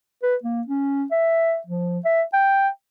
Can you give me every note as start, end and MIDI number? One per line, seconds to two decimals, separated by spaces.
0.23 0.36 71
0.44 0.62 58
0.67 1.05 61
1.11 1.58 76
1.67 1.99 53
2.05 2.23 76
2.33 2.69 79